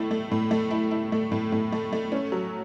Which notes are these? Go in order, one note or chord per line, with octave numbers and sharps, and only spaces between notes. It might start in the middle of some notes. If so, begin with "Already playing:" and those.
Already playing: A2 A3 E4
A3
A2
A3
E4
E4
A3
A2
A2
A3
A3
C#4
F#3